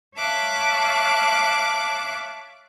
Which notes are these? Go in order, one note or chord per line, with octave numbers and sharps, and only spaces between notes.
C#5 E5 F5 A5 D6 F#6